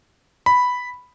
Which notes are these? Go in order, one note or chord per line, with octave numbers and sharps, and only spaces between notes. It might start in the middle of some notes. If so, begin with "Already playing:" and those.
B5